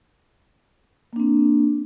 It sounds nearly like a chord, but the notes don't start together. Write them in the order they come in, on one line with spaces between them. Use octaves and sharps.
A#3 D4 C4